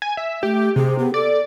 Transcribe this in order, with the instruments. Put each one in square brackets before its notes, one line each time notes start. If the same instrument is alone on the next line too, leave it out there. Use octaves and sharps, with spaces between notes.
[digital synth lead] G#5
E5
[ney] A3 [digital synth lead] G4
[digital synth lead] C3 [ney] G#4
[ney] B3
[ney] A4 [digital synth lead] D5